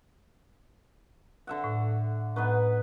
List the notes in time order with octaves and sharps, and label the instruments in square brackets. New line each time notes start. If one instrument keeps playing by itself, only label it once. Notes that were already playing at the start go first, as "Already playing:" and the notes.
[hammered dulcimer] D3 E5 F#5
[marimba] A2
[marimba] A2 [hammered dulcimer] B3 D#4 B4